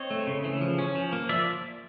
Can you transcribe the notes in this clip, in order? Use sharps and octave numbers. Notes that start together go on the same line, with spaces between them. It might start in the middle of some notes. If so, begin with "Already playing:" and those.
Already playing: C4 C#5 D#5
A3
C#3
E3
F3
C#4
F3
A#3
F3 D5 E5